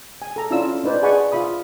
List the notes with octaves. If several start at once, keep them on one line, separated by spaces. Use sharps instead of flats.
G#5
A4 A#5
C#4 D4 E4 F4 E5 E6
D4 D#4 B4 C5 D5
G#4 D5 F#5 G#5 B5 C#6
F4 E5 B5 D#6